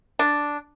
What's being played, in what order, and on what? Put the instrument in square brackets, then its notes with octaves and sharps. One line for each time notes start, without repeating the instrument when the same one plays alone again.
[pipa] D4